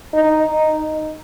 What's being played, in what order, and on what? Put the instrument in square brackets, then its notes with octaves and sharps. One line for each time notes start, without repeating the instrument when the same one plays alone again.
[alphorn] D#4